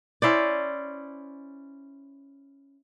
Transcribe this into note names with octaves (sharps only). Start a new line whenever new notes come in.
C#4 E4 C5 D5